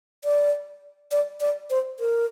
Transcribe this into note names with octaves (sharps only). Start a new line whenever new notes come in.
D5
D5
D5
C5
A#4